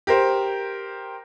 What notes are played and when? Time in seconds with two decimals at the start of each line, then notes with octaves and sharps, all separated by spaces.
0.07 G4 A#4 C5